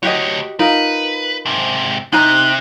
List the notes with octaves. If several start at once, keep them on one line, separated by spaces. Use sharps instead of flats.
D2 F#4 G4 C#5 D#5
D#4 F4 A#4 B4
G#2 C3
C3 D#4 G#5 A#5 F#6